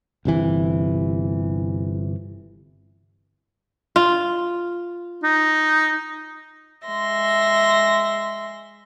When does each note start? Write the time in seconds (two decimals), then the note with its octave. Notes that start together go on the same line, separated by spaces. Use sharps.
0.25 G1 C3 E3
3.96 F4
5.24 D#4
6.86 G#3 E5 C6 A#6